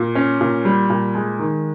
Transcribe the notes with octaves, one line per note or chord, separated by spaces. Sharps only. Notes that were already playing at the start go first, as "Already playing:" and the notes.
Already playing: A#2
C#4
A#2
G3
A#2
G#3
D#3